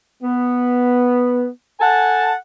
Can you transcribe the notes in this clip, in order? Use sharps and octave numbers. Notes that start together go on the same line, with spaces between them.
B3
A4 F#5 G#5 A5